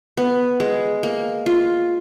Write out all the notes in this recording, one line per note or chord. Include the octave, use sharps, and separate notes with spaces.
B3
G#3
A#3
F4